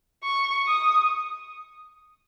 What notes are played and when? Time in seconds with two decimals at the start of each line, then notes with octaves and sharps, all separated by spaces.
0.23 C#6
0.67 D#6